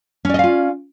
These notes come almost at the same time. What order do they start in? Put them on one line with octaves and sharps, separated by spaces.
C#4 D5 D#5 F5 F4